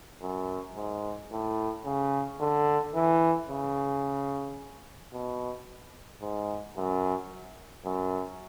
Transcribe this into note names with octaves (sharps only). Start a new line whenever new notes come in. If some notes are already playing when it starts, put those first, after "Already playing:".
F#2
G#2
A2
C#3
D3
E3
C#3
B2
G#2
F#2
F#2